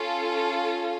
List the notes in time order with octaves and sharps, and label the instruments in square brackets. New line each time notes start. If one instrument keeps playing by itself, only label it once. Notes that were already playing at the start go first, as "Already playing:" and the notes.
Already playing: [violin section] C#4 F4 A4